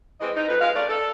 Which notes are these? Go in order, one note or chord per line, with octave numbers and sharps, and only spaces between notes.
E3 G#3 C4 D#5
D#4
F2 B4
G#3 F5
A3 C#4 A#4 D5
A4